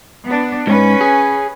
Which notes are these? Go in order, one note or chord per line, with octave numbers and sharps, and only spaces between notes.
B3 D4
G#2 C#4 B4
G#4